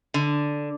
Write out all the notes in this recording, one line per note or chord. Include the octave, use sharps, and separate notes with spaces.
D3